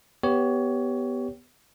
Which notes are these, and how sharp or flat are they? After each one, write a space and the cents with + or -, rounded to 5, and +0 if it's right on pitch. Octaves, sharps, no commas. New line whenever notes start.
B3 +0 G4 +0 C#5 +20